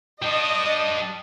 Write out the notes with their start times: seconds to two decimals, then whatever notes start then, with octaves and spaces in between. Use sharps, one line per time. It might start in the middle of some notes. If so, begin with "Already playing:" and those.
0.22 G3 D4 D#5